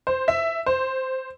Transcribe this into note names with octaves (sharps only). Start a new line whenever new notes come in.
C5
E5
C5